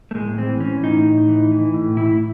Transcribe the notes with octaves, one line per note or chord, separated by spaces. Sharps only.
A3
A2 G#3
E3 C4
E3 C#4
A2 D#4
A2
E3
E3
A2
A2 E4